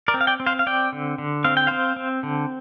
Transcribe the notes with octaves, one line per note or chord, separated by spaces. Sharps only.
A#4 D5
C4
F5
D5 G5
C4
C5 F5
F5
C4 D5 G5
D3
D3
C4 F5
G5
C4 C5 F5
C4
D3